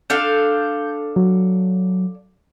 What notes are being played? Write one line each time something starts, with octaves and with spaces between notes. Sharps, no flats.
D4 A4 F5 G6
F#3